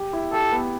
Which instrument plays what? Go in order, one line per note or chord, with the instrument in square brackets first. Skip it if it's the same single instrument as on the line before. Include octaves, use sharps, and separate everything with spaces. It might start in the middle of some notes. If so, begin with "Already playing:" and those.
Already playing: [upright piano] G4
E4
[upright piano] G4 [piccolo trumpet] A4
[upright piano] B3